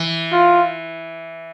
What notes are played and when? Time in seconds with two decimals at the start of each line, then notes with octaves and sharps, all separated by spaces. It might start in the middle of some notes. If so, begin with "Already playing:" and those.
Already playing: E3
0.32 F4